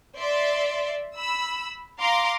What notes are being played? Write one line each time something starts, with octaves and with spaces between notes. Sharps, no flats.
D5 E5 C6
B5 E6
F5 A#5 C6 D6